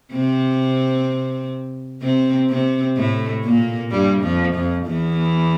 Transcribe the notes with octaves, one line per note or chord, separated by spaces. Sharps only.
C3 C4
C3 C4
C3 C4
A2 A3
A#2 A#3
G2 G3
F2 F3
F2 F3
E2 E3